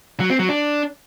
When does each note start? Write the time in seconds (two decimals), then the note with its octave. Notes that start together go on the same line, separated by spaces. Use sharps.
0.20 F#3
0.30 C4
0.39 F#3
0.49 D4